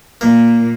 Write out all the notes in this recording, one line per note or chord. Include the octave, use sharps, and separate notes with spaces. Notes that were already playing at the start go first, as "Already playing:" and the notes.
A#2 A#3